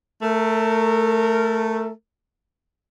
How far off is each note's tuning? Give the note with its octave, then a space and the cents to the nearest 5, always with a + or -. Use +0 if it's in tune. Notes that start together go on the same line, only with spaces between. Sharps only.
A3 +0 A#4 -25